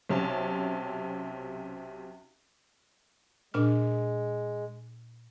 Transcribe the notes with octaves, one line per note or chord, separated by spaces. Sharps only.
B1 C3 C#4 A5
A#2 G#3 D4 F6